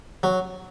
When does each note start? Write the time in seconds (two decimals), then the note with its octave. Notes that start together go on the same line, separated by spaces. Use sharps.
0.23 F#3